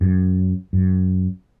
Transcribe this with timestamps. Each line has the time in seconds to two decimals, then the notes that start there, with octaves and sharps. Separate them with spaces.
0.01 F#2
0.73 F#2